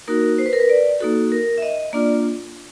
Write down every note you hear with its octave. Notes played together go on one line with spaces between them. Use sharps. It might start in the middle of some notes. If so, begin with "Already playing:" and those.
A#3 D#4 F#4 A#4
C5
B4
A#4
B4
D5
A#3 D#4 F#4 A4
A#4
E5
D#5
A#3 D4 F4 D5